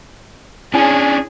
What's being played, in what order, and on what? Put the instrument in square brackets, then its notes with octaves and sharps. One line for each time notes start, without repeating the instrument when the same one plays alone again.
[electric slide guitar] C#4 D4 [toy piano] E4 C#5 G#5 [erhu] G#4